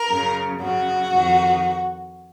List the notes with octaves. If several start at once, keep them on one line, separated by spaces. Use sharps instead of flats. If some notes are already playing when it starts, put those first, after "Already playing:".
Already playing: A#4
F#2 C#3
F#2 C#3 F#4
F2 D#3